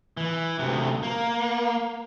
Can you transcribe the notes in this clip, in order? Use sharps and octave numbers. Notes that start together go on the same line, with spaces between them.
E3
D2 C3
A#3